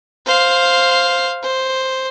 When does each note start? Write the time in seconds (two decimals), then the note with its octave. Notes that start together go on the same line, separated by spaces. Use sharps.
0.26 C5 F5
1.43 C5